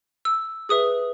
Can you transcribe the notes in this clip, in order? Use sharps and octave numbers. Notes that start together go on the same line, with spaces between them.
E6
G#4 B4 E5 D#6